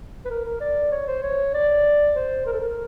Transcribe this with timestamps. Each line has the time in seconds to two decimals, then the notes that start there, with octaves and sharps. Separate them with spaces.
0.25 B4
0.30 A#4
0.45 A#4
0.61 D5
0.92 C#5
1.07 C5
1.22 C#5
1.54 D5
2.15 C5
2.46 A#4
2.53 A4
2.60 A#4